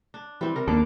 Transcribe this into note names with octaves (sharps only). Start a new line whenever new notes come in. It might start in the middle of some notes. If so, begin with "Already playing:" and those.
D4
E3 G3 C4
C3 A#4
D#2 A#3 D4 A4 D6